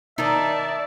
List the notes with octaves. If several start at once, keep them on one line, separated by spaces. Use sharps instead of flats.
D#3 D#4 D5 E5 A5